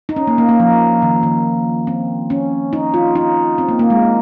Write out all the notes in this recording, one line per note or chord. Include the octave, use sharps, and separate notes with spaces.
D#4
C#4
A#3
A#3
A#3
F3
D#3
D#3
C4
C#4
D#4
F4
D#4
C4
A#3
A#3
G#3